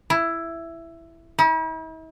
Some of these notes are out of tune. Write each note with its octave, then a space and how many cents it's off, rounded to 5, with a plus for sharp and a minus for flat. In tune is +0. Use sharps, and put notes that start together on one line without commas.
E4 +10
E4 -45